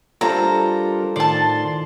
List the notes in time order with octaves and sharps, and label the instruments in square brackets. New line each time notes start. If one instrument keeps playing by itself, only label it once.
[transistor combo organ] G3 D4 A#4 [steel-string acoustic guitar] F4 A4 C5 [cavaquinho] A#5
[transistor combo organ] A2 D#3 C6 [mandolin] D5 A5